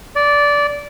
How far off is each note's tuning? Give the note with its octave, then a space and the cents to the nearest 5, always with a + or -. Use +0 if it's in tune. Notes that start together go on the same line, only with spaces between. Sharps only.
D5 -15